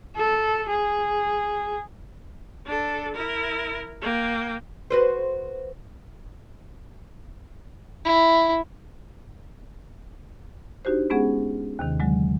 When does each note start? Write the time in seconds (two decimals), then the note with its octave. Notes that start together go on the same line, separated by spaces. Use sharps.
0.16 A4
0.68 G#4
2.66 D4 A4
3.14 E4 A#4
4.01 A#3 G5
4.90 F#4 B4 C5
8.05 E4
10.85 D4 D#4 F#4 G4 C5
11.10 G#3 B3 C#4 G#4 F#5
11.79 D#2 C3 D#3
12.00 D3 F#3 G#3